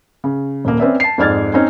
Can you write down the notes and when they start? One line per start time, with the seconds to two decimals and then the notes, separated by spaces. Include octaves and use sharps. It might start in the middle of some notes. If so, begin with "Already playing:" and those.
0.24 C#3
0.65 D#1 A#3
0.80 C4 C#4 B4 D5 E5
1.00 A5 C7
1.18 F2 G#2 D5 F6 G#6 A6
1.54 C4 C#4 D#4